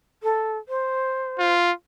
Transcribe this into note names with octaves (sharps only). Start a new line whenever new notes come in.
A4
C5
F4